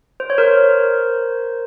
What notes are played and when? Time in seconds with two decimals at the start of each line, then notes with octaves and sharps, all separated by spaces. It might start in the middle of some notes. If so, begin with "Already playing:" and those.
0.20 C5
0.30 C#5
0.38 A#4 C5